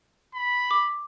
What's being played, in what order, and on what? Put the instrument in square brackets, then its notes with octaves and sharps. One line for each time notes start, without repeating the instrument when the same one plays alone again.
[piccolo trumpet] B5
[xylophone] D6